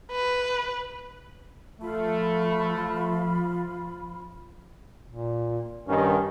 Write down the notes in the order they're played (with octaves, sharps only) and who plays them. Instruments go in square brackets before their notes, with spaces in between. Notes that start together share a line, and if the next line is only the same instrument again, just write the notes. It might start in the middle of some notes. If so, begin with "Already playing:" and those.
[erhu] B4
[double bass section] F3 [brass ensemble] A3 [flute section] F4 B5
[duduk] A#2
[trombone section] G2 D#3 [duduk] C#4